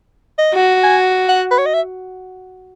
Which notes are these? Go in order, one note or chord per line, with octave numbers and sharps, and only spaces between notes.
D#5
F#4
G#5
F#5
B4
C#5
D#5
E5